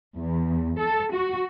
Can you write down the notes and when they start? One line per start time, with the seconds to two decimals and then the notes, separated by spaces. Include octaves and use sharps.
0.18 E2
0.79 A4
1.12 F#4